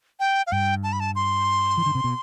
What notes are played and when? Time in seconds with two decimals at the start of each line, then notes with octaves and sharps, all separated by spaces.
0.20 G5
0.47 F5
0.52 G2 G5
0.83 A5
0.93 B5
1.00 A5
1.15 C6
1.78 E3
1.86 D3
1.95 C3
2.04 B2